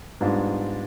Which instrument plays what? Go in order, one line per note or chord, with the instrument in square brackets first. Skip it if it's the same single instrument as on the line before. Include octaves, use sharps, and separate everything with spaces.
[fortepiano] G#2 G3 B3 D4 F4